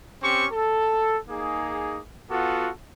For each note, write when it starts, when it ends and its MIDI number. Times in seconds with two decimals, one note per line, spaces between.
0.23 0.45 60
0.23 0.45 61
0.23 0.45 67
0.23 0.45 85
0.51 1.17 69
1.29 1.97 58
1.29 1.97 63
1.29 1.97 68
2.29 2.69 59
2.29 2.69 65
2.29 2.69 66
2.29 2.69 69